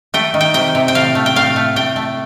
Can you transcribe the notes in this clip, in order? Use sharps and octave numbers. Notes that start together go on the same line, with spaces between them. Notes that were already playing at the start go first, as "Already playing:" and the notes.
A3 G5
D#3
G5
C3 G5
C3
G5
A2 F5
A3
G5
A2 F5
A3
A2 G5
A3